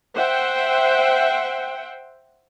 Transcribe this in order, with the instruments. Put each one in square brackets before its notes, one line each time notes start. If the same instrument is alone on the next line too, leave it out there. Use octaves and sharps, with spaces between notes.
[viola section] C5 E5 F#5 G5